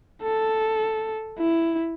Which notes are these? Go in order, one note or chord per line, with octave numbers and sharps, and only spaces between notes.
A4
E4